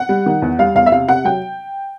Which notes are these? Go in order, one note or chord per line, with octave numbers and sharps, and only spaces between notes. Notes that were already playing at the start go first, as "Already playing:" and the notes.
Already playing: F#5
G3
D#3
E2
G3 F5
E2 F5
E5
C3 F5
C3 F#5
F#3 G5